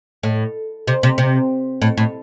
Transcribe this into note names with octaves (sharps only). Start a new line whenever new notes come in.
A2
C3
C3
C3
A2
A2